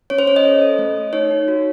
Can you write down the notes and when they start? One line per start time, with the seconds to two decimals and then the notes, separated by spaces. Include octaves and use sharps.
0.10 C#4 C#5
0.19 C5
0.27 C#4 C#5
0.36 D#5
0.45 A4
0.61 A4
0.79 A3
0.96 A3
1.13 D#4 C#5
1.31 D#4
1.48 F#4